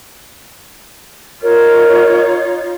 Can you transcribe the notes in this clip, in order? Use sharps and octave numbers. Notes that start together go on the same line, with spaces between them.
D#4 F4 A#4 C#5